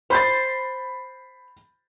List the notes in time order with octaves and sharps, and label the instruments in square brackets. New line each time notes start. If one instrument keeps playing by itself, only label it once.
[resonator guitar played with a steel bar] C5 [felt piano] B5 G6 A6